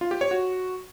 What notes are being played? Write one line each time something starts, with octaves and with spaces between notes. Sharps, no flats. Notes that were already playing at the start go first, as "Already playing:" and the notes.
F4
G4
C#5
F#4